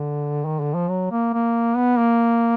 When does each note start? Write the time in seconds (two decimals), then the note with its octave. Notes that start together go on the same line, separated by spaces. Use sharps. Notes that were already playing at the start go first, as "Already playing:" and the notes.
Already playing: D3
0.45 D#3
0.60 D3
0.74 F3
0.89 F#3
1.11 A#3
1.33 A#3
1.77 B3
1.98 A#3